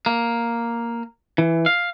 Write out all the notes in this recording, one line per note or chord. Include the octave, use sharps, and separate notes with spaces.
A#3
E3
F5